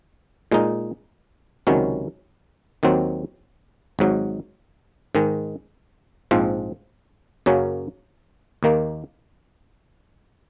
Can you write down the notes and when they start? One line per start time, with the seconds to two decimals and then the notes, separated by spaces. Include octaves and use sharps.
0.52 A#2 G#3 D#4
1.67 C#2 C3 D#3 F#3 C#4
2.83 D#2 D#3 F#3 C4
3.99 G#1 G#2 F#3
5.15 G#2 D#3 G#3
6.31 A#1 G#2 F3 C4
7.46 F#2 C#3 F#3 A#3 C#4
8.63 D#2 D#3 A#3